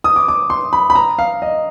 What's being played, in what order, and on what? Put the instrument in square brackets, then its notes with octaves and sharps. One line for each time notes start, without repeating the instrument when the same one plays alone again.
[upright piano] D#6
D6
D6
C6
B5
B5
A#5
F5
D#5